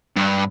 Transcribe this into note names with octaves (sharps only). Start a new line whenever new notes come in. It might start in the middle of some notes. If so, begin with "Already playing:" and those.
G2